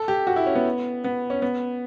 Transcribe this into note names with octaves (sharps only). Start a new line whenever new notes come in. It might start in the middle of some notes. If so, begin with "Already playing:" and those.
Already playing: A4
G4
F#4
E4
C#4
B3
B3
C#4
B3